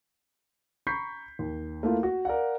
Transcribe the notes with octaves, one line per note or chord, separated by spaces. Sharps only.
A#5 B5 C#6 G6 B6 C7
D#2
A3 A#3 E4 F4
F#4
A#4 D5 F5 F#5